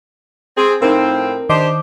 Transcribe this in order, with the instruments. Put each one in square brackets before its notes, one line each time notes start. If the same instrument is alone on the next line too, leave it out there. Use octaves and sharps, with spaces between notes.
[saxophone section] C4 G#4
[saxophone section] A2 F3 C4 [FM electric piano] D#4 A#4
[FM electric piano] D#3 D#5 D6 [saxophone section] D4 G4 C5